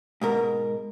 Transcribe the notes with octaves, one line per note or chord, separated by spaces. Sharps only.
G#2 B2 A#4